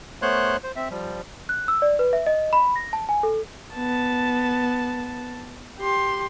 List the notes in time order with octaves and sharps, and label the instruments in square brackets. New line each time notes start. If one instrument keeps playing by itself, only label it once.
[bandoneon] A3 B3 C5 C#5 C6 F#6
C5
C4 E5
F3 G3
[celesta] F#6
E6
D5
B4
E5
D#5
B5
A#6
A5
G#5
A4
[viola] B3 A5
G4 C6